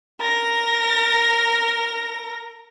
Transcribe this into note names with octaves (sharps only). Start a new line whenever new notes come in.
A#4 A#6